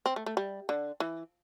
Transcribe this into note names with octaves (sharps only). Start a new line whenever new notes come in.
C4
A3
A3
G3
D3
E3